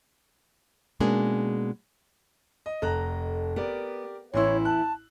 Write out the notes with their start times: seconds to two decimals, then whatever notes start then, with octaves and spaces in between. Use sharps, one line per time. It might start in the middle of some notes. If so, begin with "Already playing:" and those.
1.00 B2 G#3 A#3 C#4 D4 G#4
2.66 D#5
2.82 F1 A4 D#5 A#5 F#6
3.56 B3 G4 A#4 D5
4.34 A1 E3 B3 E4 C#5 C6 E6
4.65 A5 F#6